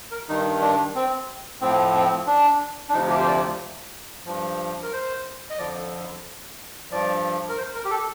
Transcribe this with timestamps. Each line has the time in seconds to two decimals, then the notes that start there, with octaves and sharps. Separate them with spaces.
0.11 A#4
0.28 G2 D#3 D#4
0.62 D4
0.95 C4
1.62 A2 F3 C4
1.95 C4
2.27 D4
2.89 D4
2.93 D2 C3 F3 D#4
3.10 G4
3.21 C5
3.27 D5
4.26 G2 F3
4.83 A#4
4.93 C5
5.50 D#5
5.58 F2 D3 F3 D5
6.91 G2 F3 D5
7.49 A#4
7.58 C5
7.74 A#4
7.85 G4
7.90 A4